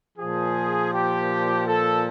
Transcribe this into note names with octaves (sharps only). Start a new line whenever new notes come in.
A#2 F3 G#4
G4
A4